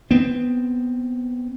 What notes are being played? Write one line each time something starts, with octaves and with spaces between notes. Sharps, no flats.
B3 C4